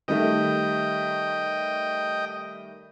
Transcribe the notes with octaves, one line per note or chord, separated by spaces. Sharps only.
D#3 G3 A3 D#5 G5